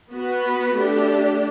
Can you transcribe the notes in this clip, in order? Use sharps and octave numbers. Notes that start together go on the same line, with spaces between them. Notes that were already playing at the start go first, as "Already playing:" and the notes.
B3 F#4 B4
A3 D4 G4